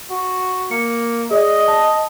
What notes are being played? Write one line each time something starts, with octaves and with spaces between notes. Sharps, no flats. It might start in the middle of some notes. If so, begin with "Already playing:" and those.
F#4
A#3 C#7
G#4 D5 D#5
A5